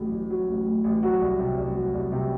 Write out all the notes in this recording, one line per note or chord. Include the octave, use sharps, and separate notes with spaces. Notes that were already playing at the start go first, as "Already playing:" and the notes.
Already playing: A1 A2 F#3
A1
F#3
A1
A2
A1
F#3 F#4
C2
C3
C2
F#3
C2
C3 G4